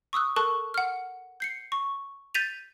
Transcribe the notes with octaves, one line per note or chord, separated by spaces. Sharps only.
C#6 D#6 E6 F#6
A4 A#4 A5 C#6 F#6
F#5 F6
G6 C7 C#7
C#6
G6 A6 B6 D#7 F7